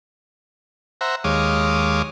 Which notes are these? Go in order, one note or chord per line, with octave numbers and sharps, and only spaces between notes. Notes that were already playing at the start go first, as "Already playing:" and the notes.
C5 E5 F#5 A#5
D#2 G#3 C#5 F5 D6 D#6